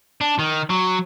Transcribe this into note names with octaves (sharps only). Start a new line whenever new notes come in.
D4
D#3
F#3